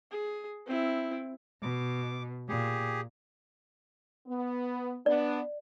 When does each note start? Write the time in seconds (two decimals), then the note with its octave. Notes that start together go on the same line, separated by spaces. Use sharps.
0.11 G#4
0.66 C4 E4
1.63 B2 D6
2.49 A#2 G4 G#4
4.27 B3
5.06 B3 D4 D5